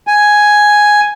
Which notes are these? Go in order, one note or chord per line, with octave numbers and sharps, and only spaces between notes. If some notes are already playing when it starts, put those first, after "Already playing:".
G#5